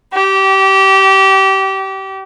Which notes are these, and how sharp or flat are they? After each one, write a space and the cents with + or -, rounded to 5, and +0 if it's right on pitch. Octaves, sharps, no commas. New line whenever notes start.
G4 -25